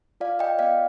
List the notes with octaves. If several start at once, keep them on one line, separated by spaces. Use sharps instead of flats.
F4 D5 F5
D#5 G5
B3 D5 F5